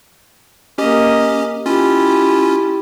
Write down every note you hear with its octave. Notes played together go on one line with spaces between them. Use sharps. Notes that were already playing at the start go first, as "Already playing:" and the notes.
A#3 C#4 G4 D#5
C#4 E4 F4 G4